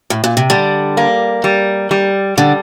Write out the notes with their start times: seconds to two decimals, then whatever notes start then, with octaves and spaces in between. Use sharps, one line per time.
0.10 A2
0.24 A#2
0.37 C3
0.50 D3 G3
0.97 A#3
1.44 G3
1.91 G3
2.37 D3 G3